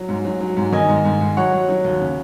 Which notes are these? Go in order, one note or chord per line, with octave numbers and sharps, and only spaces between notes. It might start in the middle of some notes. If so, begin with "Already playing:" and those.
Already playing: F#3
G#2
F#3
F#3
G#2
D#3 D#5 G#5
G#2
G#2
G#2
F#3 C#5 F#5
F#3
F#3
D#2
C#3